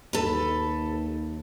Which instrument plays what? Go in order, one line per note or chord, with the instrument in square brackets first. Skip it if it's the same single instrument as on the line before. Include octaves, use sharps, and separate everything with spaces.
[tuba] D#2 [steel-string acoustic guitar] A4 B4